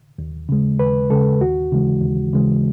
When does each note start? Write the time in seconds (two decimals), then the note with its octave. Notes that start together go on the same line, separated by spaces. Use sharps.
0.18 D#2
0.49 C#3 G#3
0.79 D#2 B4
1.10 C#3 G#3 A4
1.41 D#2 F#4
1.72 C#3 E3 G#3
2.02 D#2
2.33 C#3 E3 G#3